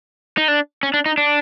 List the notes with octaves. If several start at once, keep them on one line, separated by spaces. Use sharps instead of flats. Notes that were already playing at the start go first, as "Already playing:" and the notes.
D#4
D4
C#4
D4
D#4
D4